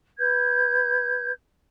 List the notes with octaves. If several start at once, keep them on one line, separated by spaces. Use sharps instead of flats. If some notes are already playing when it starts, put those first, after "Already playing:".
B4 G6 G#6